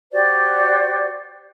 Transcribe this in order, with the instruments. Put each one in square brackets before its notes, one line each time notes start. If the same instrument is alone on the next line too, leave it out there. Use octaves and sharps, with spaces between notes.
[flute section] F#4 G4 C5 D5